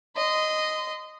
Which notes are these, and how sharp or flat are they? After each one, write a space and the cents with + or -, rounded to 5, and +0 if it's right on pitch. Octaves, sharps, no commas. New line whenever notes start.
D#5 +0 C6 -30